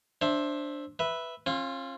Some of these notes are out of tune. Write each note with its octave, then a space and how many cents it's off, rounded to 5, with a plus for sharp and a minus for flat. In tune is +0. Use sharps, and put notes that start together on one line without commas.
D4 +0 C5 +15 E5 +0
B4 +0 E5 +0
C#4 -40 F4 +0